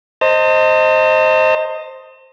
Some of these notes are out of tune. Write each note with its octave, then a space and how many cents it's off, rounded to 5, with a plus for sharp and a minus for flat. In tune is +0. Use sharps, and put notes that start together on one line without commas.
C5 +5 D#5 +5 A5 +45